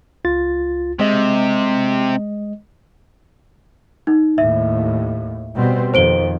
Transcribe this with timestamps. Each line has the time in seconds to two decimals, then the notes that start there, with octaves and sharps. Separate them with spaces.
0.25 C#2 F4 A6
1.00 C3 G#3 D#5
4.07 D#4
4.38 D#2 A2 E5
5.55 B2 G3 C4
5.94 F2 D#3 C5 D7 G7